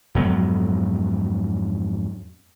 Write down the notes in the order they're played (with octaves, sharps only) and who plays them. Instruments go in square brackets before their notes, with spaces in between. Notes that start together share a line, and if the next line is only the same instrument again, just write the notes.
[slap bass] F2 G#2 F#3 B3